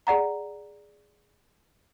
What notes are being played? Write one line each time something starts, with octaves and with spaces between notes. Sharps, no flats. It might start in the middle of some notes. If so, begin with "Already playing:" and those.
G#4 D5 F#5 A#5